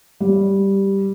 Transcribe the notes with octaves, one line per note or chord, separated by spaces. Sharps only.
G3